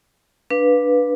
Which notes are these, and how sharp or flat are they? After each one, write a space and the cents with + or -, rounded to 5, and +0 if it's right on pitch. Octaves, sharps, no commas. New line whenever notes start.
D4 +0 B4 -10 F5 +10